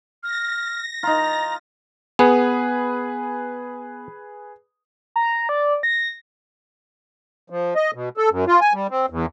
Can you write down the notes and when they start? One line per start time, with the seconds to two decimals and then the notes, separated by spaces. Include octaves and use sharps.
0.23 F6 A#6
1.03 D#4 F4 A#5
2.19 B3 G#4 B4
5.16 A#5
5.49 D5
5.83 A#6
7.50 F3
7.76 D#5
7.94 B2
8.17 A4
8.30 F#2
8.47 F4
8.61 G#5
8.73 G3
8.90 C4
9.10 E2